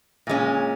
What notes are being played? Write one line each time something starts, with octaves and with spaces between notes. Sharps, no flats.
A#2 G#3 C#4